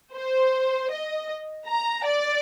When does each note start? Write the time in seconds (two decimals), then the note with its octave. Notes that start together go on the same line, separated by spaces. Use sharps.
0.13 C5
0.91 D#5
1.67 A#5
2.06 D5